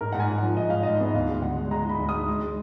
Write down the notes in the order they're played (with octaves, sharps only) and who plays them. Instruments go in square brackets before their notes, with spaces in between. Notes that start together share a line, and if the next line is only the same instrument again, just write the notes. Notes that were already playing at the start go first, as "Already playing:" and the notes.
[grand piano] G#2 A#4
G#2 F#5
G#5
G#2
F3 F#5
G#2 D#5
G#2 F5
G#2 D#5
B3 D#5
D2 F5
G#3
D3 F#5
G#3
G#3 A#5
D#4 B5
D2
D#6
G#3
G#3
G#3